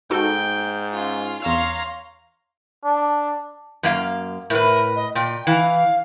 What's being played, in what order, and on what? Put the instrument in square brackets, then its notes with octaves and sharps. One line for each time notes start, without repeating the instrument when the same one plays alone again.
[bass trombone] G#2 [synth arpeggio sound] D#4 F#4 A4 [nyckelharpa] G5
[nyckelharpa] C#4 [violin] F4
[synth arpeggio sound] E2 E6 [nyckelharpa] C#5 C6 [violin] F5 A#5
[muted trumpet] D4
[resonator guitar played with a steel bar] F#2 A#3 F5
[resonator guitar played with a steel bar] A2 B4 [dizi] A#4
[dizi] D#5
[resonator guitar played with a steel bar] A#2 [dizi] G5
[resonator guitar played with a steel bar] E3 [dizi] F5